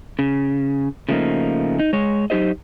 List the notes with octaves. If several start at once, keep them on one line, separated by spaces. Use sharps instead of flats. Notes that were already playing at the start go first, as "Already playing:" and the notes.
C#3
C#3 F3 A3 A#3 D#4
D#4
G#3 C#5
F#3 D#4 G4 C5 D#5